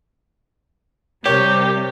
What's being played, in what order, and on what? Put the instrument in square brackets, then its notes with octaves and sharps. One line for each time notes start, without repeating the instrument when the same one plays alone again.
[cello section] C3 G3 [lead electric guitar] G4 [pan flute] A#4 [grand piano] C#5